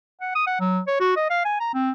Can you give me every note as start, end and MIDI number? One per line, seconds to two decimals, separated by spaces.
0.21 0.32 78
0.35 0.44 87
0.47 0.56 78
0.60 0.80 54
0.88 0.98 73
1.00 1.15 66
1.16 1.29 75
1.30 1.44 77
1.45 1.56 80
1.60 1.69 82
1.74 1.91 60